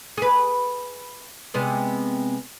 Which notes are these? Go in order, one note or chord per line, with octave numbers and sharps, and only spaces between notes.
G#4 B4
C3 G#3 B3